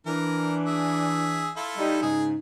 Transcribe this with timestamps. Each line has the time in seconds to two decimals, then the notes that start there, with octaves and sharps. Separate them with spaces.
0.06 E3 D4 A#4
0.66 G#4 E5
1.57 E4 F4 A4
1.77 G3 D#4
2.02 G#2 C#3 D#4 G#4